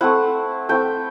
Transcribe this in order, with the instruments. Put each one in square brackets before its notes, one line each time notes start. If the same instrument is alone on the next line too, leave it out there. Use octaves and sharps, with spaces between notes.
[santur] A3 C4 E4 F#5
A3 C4 E4 G5